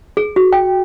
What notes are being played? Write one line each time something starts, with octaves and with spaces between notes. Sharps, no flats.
G#4
F#4
G5